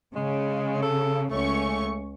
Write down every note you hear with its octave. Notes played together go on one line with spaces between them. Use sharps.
C#3 G#3
A4
C#2 A3 C#4 C#6